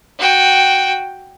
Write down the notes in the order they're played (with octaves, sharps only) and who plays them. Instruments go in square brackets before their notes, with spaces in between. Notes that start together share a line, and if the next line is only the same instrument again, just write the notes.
[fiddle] F#4 G5